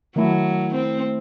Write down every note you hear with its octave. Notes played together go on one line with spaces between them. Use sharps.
D#3 F#3 A3 E4
C4